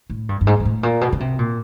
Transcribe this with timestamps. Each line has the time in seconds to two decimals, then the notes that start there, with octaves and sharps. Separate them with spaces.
0.10 A2
0.29 G2
0.41 G2
0.47 G#2
0.60 G#2
0.65 A2
0.83 A#2
1.01 B2
1.12 C#3
1.20 C3
1.39 A#2